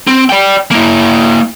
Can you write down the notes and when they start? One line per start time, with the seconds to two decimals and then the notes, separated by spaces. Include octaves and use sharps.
0.07 C4
0.29 D5 G5
0.71 A#3 E4